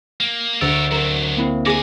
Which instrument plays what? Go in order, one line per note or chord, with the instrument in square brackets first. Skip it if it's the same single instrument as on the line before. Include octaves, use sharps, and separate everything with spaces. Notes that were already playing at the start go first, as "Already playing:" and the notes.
[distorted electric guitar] A#3
[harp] D2 [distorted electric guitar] A#4 C#5 [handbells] E6 A6 D7
[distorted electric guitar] F#3 C4 [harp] A#4
[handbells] A#3 C4 E4
[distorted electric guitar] A3 G#5 [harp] G#4 D6 A#6